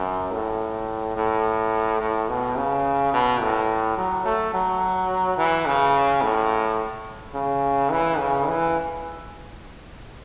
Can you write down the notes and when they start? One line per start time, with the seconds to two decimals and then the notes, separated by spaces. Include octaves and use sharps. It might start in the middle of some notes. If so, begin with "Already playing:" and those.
Already playing: F#2
0.32 A2
1.17 A2
2.01 A2
2.29 B2
2.57 C#3
3.13 B2
3.41 A2
3.98 F#3
4.25 A3
4.54 F#3
5.38 E3
5.66 C#3
6.22 A2
7.34 C#3
7.91 E3
8.19 C#3
8.47 E3